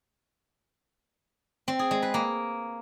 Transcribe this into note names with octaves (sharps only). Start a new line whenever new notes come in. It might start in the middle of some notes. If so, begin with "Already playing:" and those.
C4
G#4
G#3
B4
A#3